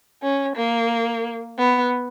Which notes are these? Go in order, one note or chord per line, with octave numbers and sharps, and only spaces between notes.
C#4
A#3
B3